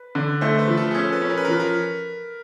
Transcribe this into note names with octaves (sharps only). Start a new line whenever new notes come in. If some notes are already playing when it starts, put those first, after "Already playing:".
Already playing: B4
D3
A3 C5
C5
B4
F3
A4
G#4
C#4 A4
B4
C#4
A#4
B4
A#4
F3 B4
A#4